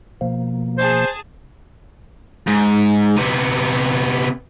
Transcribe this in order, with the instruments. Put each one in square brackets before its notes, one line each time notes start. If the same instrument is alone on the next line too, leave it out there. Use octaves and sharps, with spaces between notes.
[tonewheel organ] B2 F3 A#3
[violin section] G#4 A5 [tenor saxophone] C5
[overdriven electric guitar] G#2
C3 B3